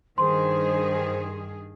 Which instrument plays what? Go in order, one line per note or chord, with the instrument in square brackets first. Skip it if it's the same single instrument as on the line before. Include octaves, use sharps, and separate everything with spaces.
[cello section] G2 D#3 G#4 [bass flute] C5 [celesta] C6